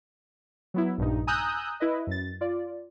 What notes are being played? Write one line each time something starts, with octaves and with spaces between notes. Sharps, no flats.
F#3 B3 E4
A#1 G2 A#2 D#4
G#5 A#5 D#6 E6 F#6 G6
E4 B4 D#5
F#2 A6
F4 D5